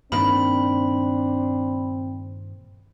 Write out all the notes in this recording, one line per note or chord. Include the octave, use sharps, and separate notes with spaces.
G2 A#2 D#3 C4 D4 B5